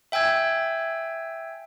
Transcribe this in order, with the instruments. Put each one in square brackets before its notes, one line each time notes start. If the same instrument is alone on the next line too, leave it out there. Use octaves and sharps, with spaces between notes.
[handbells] E5 G5 G#5 E6 G#6